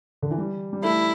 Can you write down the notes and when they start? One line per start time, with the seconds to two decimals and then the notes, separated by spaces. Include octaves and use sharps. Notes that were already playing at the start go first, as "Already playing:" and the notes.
0.22 D3
0.31 E3
0.38 G3
0.73 G3
0.83 A3 E4